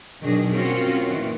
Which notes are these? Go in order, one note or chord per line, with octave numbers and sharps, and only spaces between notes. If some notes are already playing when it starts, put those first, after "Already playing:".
B2 D#3 F#3 D4 G#4 D#5
C4 C#4 F4 F#4 A#4 C#5
A#2 D#3 E3